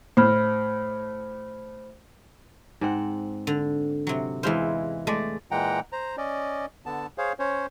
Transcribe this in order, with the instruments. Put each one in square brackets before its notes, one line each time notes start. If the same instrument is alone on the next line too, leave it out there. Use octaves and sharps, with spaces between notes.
[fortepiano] A2 [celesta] C5 B5 F6
[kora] G#2 C4 F#5
[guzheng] D3
C3 F#3
[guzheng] E2 E4 C5 [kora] E3 G#3 F5
[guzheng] G#3 [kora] A3 D5
[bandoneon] A#2 E3 G#3 F#5 G5 A#5
C5 A#5
C#4 D5 D#5
D3 B3 A5
G#4 C5 C#5 F5
C#4 C5 C#5